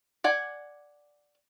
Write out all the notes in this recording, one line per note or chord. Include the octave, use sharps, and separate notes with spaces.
D5 F#5 G#5